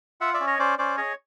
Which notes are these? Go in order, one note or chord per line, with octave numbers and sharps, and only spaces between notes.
F4 E5 F#5
D5 E5
C#4
C#5 D#5
C#4 C5 D5
C#4 C5 D5
G#4 C#5 D#5